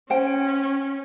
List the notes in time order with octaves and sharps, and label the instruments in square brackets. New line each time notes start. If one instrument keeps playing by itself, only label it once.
[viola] C#4 [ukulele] C5 G5